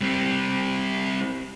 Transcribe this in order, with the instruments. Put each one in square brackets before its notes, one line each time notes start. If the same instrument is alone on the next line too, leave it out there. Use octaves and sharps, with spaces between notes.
[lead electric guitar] G3 C4